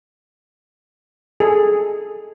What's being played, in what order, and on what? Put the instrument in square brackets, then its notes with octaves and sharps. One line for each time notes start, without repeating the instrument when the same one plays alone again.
[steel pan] G#4 A4